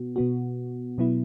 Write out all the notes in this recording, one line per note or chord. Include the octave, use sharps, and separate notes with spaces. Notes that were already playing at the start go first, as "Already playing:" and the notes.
Already playing: B2 B3 F#4
B2 B3 F#4
B2 F#3 B3 E4